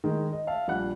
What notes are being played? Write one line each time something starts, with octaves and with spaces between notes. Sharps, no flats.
D#3 G#3
D#5
E5 F5 A5
A#1 G3 F#5 F#6